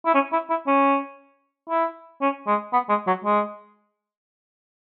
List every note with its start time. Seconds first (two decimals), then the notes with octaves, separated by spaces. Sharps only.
0.06 E4
0.15 C#4
0.33 E4
0.50 E4
0.67 C#4
1.70 E4
2.21 C#4
2.47 G#3
2.73 B3
2.89 G#3
3.07 F#3
3.24 G#3